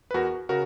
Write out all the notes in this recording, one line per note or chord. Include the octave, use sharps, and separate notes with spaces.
B4
E2 F#4 A#4
C#3 F#4 A#4